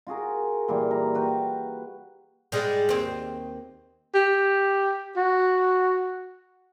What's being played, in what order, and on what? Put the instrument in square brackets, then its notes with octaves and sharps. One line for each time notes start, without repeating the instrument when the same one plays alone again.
[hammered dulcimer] F4 F#4 G#4 A#4
A#2 E3 G3
A#5
F#4 B4 G5
[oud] G#2 G3 G#3
D#2 C4
[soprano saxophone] G4
F#4